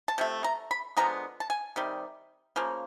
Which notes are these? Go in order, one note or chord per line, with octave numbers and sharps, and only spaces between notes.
A5
C3 F3 A3
A#5
B5
D3 F3 G#3 B3 A#5
A5
G#5
C3 D#3 G3
C#3 F3 A#3